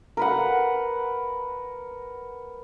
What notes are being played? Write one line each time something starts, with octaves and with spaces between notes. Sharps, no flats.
A#4 B4 F#5